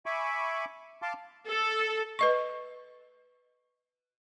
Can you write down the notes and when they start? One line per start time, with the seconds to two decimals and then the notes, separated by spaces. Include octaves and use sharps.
0.06 E5 G#5 B5 C#6 D6
1.02 F5 A5 C6 D6
1.49 A4
2.19 B4 D#5 C#6